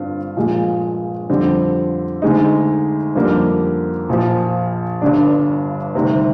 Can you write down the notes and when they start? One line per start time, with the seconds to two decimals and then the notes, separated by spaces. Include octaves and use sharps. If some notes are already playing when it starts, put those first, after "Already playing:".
Already playing: G2 D3 C4 F4
0.37 A#1 A#2 G#3
1.29 F2 D3 G3 C4
2.22 D2 D3 G#3 D#4
3.15 F2 D3 G3 A#3
4.09 A#1 A#2 F3
5.02 G1 G2 D3 G3 D4
5.95 D2 C3 D#3 G3